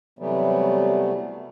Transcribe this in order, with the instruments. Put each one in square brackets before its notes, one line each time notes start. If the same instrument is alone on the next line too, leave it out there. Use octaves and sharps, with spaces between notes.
[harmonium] C3 E3 F#3 G3 A3 B3